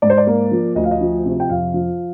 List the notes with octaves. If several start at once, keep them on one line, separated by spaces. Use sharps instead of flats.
G#2 D5
C5
D5
A#3
F3
D2 D#5
F5
D#5
F3
C3
G5
F2 F5
F3